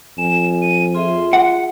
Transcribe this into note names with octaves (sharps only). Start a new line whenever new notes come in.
F2 G#5 E7
D#7
F4 G#4 E5 C6
F#5